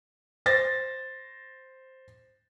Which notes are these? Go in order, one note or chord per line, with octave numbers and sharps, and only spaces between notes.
C5 A6 A#6